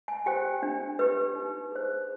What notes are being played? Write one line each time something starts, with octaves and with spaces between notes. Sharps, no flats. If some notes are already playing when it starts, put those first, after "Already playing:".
G#5
G4 C5 G5
D4
G4 B4
D#4
G#4 C5